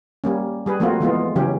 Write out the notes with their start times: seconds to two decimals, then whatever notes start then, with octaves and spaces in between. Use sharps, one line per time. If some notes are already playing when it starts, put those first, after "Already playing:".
0.24 G3 A#3 C#4
0.66 G3 G#4 B4
0.80 F3 A3 A#3 C4 F4 F#4
1.00 E3 G#3 B3 F4
1.36 C#3 E3 F#3 C#4 G4